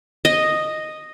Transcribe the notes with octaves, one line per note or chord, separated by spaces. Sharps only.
D#5